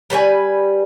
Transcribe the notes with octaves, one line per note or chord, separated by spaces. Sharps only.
G3 B4 C5 G#5